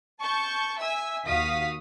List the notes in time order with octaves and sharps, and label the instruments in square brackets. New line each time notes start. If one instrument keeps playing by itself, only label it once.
[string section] A5 C#6 G6
E5 G#5 E6
D#2 F#4 F5 D#6 B6